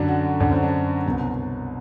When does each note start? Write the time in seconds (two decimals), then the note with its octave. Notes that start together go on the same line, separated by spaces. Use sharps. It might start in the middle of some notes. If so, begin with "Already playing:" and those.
Already playing: F#2 D3 D4
0.08 F#4
0.40 F#2 D3 D4
0.52 C4
0.63 D4
1.06 C2 B2